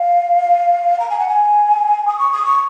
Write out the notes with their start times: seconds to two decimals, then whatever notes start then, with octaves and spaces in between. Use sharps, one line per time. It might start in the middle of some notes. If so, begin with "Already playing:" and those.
Already playing: F5
1.00 A#5
1.10 G#5
1.19 F#5
1.29 G#5
2.08 D#6
2.19 C#6
2.33 D#6
2.46 C#6